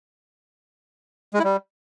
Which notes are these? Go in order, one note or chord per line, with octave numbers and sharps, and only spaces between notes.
G#3
E4
G3